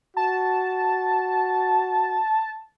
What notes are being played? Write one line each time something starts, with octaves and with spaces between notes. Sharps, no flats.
F#4 A5